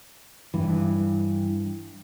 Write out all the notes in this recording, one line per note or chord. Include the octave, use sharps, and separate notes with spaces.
G2 E3